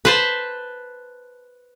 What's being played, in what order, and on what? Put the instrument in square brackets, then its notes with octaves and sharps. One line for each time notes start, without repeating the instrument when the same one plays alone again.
[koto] B4 C5 A5